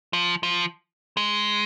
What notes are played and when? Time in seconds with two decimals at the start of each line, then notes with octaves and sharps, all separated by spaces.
0.13 F3
0.43 F3
1.17 G#3